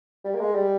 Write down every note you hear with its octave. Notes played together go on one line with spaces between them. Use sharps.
G3
A#3
G#3
G3